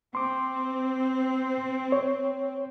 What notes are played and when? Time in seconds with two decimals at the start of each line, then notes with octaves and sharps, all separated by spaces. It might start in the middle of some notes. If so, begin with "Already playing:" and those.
0.15 C4 C6 D6
1.92 C#5